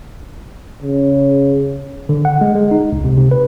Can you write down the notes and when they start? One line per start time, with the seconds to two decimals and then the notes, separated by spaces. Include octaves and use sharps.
0.82 C#3
2.09 D3
2.25 F#5
2.41 G#3
2.55 G#3
2.71 D#4
2.92 C#2
3.05 C3
3.18 C3
3.31 B4